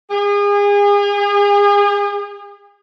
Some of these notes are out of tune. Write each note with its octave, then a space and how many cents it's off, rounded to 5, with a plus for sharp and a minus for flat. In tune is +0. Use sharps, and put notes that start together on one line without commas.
G#4 -35